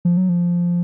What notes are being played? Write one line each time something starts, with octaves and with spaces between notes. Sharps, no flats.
F3
F#3
F3